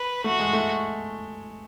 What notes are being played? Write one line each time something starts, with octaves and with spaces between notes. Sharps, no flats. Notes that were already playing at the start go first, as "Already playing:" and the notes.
Already playing: B4
A3 F#4
G#3
A3